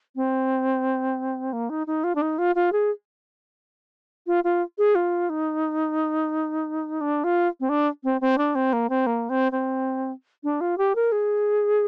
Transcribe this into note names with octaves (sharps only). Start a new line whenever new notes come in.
C4
A#3
D#4
D#4
F4
D4
D#4
F4
F4
G#4
F4
F4
G#4
F4
D#4
D4
F4
C4
D4
C4
C4
D4
C4
A#3
C4
A#3
C4
C4
D4
F4
G4
A#4
G#4